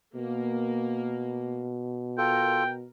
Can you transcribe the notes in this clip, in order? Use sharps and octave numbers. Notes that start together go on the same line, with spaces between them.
B2 A#3
F4 A4 A#4 G5